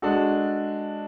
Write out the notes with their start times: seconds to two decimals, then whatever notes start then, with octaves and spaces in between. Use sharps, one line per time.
0.02 G#3 D4 F#4 A4